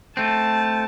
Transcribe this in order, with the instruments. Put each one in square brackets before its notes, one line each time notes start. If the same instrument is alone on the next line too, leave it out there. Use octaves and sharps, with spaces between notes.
[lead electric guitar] A3 C4 [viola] A5